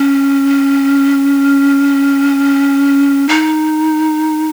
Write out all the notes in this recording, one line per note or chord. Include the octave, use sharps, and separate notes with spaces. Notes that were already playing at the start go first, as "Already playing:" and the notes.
Already playing: C#4
D#4